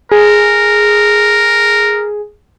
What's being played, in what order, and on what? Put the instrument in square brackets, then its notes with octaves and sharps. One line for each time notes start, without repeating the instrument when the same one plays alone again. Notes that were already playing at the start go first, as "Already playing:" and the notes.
[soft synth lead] G#4 [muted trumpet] A#4